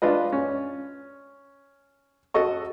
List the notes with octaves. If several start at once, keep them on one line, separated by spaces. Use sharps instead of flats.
D4 F4 B4 D#5
C#4
F#4 A4 D#5 C#6